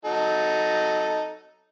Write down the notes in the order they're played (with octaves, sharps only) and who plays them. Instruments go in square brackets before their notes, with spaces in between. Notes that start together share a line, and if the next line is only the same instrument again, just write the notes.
[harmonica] F#3 D#4 A4